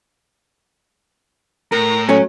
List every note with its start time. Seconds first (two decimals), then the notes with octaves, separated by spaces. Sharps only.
1.72 A2 A#4 A#5
2.09 F#3 A3 C#4